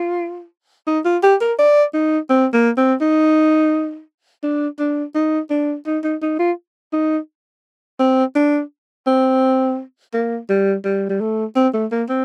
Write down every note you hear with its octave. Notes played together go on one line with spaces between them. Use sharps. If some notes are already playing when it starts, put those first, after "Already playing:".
Already playing: F4
D#4
F4
G4
A#4
D5
D#4
C4
A#3
C4
D#4
D4
D4
D#4
D4
D#4
D#4
D#4
F4
D#4
C4
D4
C4
A#3
G3
G3
G3
A3
C4
A3
A#3
C4